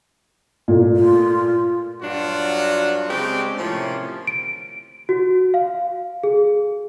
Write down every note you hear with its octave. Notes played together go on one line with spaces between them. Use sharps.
A#2 A3
F4
G2 F#3 D4 F4 F#4
C#3 G#3 C4 D4 G4
A2 C3 F3 A#3 C#4
D7
F#4
F5
G#4